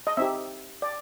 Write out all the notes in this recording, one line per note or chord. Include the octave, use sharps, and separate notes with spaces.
D#5
C4 D#4 G4 E5
D5